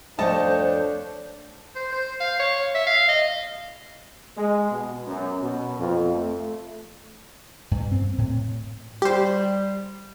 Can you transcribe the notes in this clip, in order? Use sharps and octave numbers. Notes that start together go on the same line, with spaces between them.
F2 A3 D4 C5 C#5 D#5 A5
C5
C5
F5
C#5
E5
F5
D#5
G#3
B2
F#2
B2
F2
A3
G2
C4
A2
G3 G4 C5